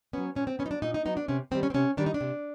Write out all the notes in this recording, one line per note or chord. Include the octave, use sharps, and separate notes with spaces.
F#3 B3 C#4
A#2 C#4
C4
B3 C#4
F#3 D#4
D4
A#2 D#4
D#4
F#3 B3 D#4
D4
C3 C#4
D#3 G3 C4
C#4
C4
C3 C#4
D#3 G3 D4
D#4
D4
C3